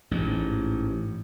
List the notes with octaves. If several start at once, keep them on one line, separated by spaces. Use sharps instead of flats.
A1 G#2